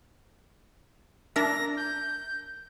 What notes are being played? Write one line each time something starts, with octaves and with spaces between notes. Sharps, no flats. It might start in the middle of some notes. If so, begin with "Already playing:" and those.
D4 A#4 E5 A#6
G6